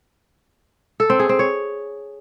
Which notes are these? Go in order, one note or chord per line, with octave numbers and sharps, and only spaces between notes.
A4
C4
G#4
C4
C#5